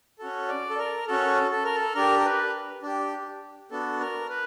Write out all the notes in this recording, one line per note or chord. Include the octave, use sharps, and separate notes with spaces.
C#4 F#4 A4
D5
A4
A#4
C#4 F#4 A4
A4
A#4
A4
D4 G4 A#4
A#4
B4
D4 G4
B3 D4 F#4 A4
A#4
B4